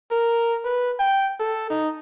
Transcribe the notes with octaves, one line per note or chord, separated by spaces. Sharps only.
A#4
B4
G5
A4
D#4